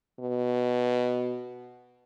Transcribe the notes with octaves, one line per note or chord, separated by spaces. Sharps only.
B2